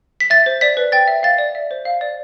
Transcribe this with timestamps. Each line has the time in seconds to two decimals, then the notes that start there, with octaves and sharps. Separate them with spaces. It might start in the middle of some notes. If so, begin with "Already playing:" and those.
0.20 B6
0.30 E5 A6
0.46 C5
0.61 D5 B6
0.77 B4
0.92 G5 A6
1.08 E5
1.23 F5 A6
1.38 D5
1.55 E5
1.71 C5
1.85 F5
2.01 D5